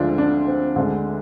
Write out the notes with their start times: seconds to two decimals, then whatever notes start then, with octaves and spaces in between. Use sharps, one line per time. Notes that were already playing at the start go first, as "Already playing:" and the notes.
Already playing: D2 D3 F3 G#3 D4 F4
0.18 D4
0.47 C4
0.76 D2 D3 G#3 D4